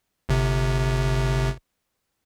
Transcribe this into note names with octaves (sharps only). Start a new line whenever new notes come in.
G1 C3